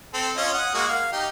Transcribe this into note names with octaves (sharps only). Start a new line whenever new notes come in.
C4 A4
C#4 F4 D#5
F#5 D#6
G#3 A#3 F#4
F5
D#4 G4